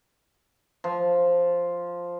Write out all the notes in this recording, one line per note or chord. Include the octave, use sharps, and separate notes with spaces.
F3